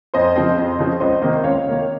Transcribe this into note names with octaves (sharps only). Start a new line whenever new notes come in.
F2 C5 D#5
C#3 F3 C4
F2
C#3 F3 C4
C#2 C5 D#5
C3 D#3 A#3
C#2 C#5 F5
C3 D#3 A#3